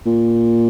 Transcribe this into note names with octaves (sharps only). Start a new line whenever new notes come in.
A#2